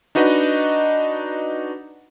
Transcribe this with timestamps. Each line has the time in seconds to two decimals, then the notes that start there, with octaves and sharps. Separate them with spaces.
0.15 D4 D#4 F#4 B4 D#5